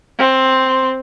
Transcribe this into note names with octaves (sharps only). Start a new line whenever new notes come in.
C4